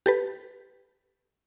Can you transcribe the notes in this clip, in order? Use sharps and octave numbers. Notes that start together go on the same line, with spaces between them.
G4 A4 B4